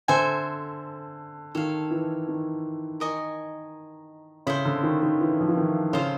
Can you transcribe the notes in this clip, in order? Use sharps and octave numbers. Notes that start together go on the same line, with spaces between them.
D3 A4 C5 E5 G#5
D#3 A4 C#5 F5
E3
D#3
A#4 D#5 G#5 C#6
C#3 E4 A4 C5
D3
D#3
D#3
E3
F3
E3
D#3
C#3 F4 A4 C5 F5